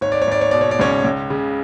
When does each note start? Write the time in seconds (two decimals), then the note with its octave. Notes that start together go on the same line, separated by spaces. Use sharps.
0.01 G#1 C#5
0.12 D5
0.21 C#5
0.27 G#1 D5
0.41 C#5
0.51 B2 D5
0.61 C#5
0.71 D5
0.79 C#2 C#4 C#5
1.04 C#2
1.30 C#3